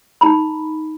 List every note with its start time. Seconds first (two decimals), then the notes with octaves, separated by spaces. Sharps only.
0.21 D#4 A#5 B5